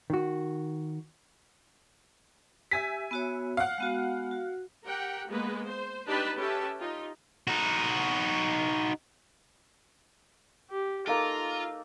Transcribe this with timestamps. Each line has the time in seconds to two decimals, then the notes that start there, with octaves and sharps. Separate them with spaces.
0.10 D#3 F#4
2.71 G4 E5 G#5 B6
3.11 B3 F#4 C#5
3.57 F5 F#5
3.78 G#3 B3 F#4
4.31 F#4
4.85 G4 A#4 F#5 G5
5.29 G#3 A#3 B3 B4
5.67 C5
6.07 D4 D#4 G4 B4 A5 B5
6.38 C#4 G4 A4 B4 E5 A5
6.78 D#4 F4 G4
7.47 D#4 F#4
10.70 G4
11.07 A#3 D#4 F4 A4 A#5